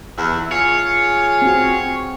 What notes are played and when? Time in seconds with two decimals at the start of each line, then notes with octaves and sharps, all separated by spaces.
0.18 E2 E4
0.51 F4 G#4 C#5
1.42 C4 F#4